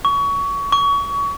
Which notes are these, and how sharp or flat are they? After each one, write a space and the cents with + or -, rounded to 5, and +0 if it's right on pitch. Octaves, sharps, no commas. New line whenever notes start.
C#6 +25
C#6 +30